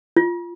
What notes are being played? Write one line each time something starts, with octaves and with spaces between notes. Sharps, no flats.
F4